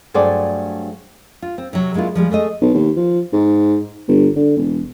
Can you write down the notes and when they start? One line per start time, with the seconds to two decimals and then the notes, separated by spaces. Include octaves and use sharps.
0.14 G2 F#3 A3 G#4 C5 D5
1.42 F4
1.58 C4
1.73 C3 F#3
1.94 F#3 G#3 A#3 E4 F4
2.15 F3 G3 G#3
2.30 G#3 A3 A4 D#5
2.61 B1
2.74 D#2
2.97 F3
3.33 G#2
4.08 G1
4.36 D3
4.56 E1